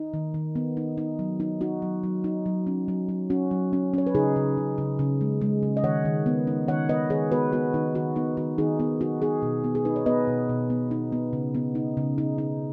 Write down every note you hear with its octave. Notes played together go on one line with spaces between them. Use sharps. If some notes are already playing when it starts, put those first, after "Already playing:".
Already playing: D#4
D#3
D#3
B3
D#4
D#4
F#3
D#4
D#4 F#4
F#3
F#3
D#4
F#3
C#4
F#3
F#3
C#4 F#4
F#3
C#4
C#4 C#5
B4
C#3 D#4 G#4
C#3
C#3
C#3
C#3
G#3
G#3
C#3
D#5
D#3 C#5 F#5
D#3
B3
D#4
D#3 C#5 F#5
B3 B4 D#5
D#3 G#4 C#5
B3 F#4 B4
B3 F#4
D#3 D#4
D#3 F#4
B3 D#4
D#3 F#4
D#3 D#4 G#4
B3 D#4
D#4 F#4
B3 D#4 G#4
B2
B3
G#4
D#4 B4
C#5
B3 B4 D#5
B2
B2
B3
D#4
B3
C#3
B3
D#4
C#3
D#4
D#4